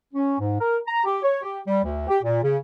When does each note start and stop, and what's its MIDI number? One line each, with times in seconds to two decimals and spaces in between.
0.13 0.34 61
0.38 0.57 44
0.59 0.76 70
0.86 1.03 82
1.04 1.17 67
1.22 1.38 73
1.41 1.58 67
1.66 1.82 55
1.83 2.08 38
2.08 2.17 67
2.22 2.39 46
2.42 2.56 49